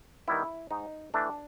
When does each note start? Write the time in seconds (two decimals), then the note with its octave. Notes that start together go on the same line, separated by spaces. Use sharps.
0.28 D#3 G3 B3 E4
0.71 G#2 D#4
1.14 E3 A3 D4